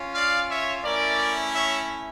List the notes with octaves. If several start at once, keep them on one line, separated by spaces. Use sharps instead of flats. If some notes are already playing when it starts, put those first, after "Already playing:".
Already playing: C#4 F4
D5 F5
C#5 E5
A3 C#4 E4 A#4 D5
C#5 E5